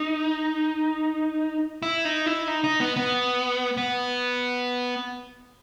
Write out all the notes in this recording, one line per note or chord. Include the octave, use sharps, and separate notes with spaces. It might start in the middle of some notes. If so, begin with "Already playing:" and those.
Already playing: D#4
E4
D#4
E4
D#4
D#4
B3
B3
B3